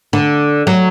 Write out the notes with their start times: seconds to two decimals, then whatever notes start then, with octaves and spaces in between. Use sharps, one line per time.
0.13 D3
0.67 F#3